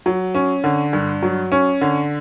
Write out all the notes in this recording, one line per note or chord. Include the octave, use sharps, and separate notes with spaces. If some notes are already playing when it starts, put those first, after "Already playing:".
F#3
C#4
D3
G2
F#3
C#4
D3